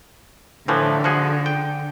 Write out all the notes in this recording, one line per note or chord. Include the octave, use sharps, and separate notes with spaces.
A2 D3 E3 F3
F3 F#4 G#4
G5